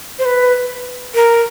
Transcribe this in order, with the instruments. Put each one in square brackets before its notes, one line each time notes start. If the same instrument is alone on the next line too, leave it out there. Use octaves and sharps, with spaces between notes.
[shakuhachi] C5
B4
A#4